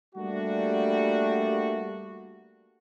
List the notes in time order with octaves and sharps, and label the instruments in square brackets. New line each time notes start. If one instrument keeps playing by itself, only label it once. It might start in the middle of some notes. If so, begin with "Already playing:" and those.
[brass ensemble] G3 A3 A#3 D4 F#4